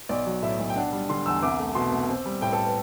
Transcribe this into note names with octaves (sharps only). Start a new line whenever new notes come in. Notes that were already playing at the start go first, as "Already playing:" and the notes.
B1 D5
F#3
A2 E5
B1
G5
D4 F#5
G3
D3 C6
E2 E6
C2 D6
A3
B2 C6
C2
C4
G3
A2 G5
A4
B4